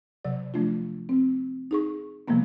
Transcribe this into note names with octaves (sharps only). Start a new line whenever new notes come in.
C3 F#3 D5
F3 A3 D4 F4
C4
D#4 G#4 C#6
C3 F3 G3 G#3 A#3 B3